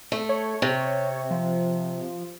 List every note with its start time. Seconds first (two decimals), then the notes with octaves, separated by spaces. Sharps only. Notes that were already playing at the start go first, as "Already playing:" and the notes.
0.12 A3
0.29 C#5
0.62 C3
1.31 F3